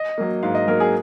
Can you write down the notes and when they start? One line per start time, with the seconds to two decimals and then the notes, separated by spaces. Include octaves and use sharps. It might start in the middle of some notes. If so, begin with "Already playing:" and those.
Already playing: D#5
0.18 F#3 A#3
0.43 G#2 F5
0.55 D#5
0.68 F#3 A#3 A#4
0.80 G#4